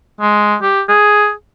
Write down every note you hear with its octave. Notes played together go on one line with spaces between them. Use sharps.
G#3
G4
G#4